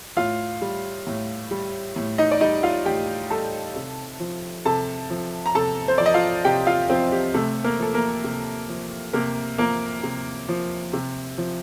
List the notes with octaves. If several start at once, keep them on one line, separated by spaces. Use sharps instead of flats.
A2 F4 F5
G3
A2
G3
A2
D#4 D#5
D5
G3 D#4 D#5
F4 F5
A2 G4 G5
G3 A4 A5
C3
F3
C3 A4 A5
F3
A#5
C3 A4 A5
C5
F3 D5
D#5
F4 F5
C3 G4 G5
F4 F5
F3 C4 C5
G4
C3 A3 A4
A#3 A#4
F3 A4
A#3 A#4
C3
F3
C3 A#3 A#4
F3 A#3 A#4
C3
F3
C3
F3